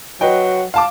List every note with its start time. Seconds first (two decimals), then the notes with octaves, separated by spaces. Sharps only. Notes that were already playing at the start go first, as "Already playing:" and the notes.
0.21 F#3 B4 D#5 G5
0.74 F5 A5 D6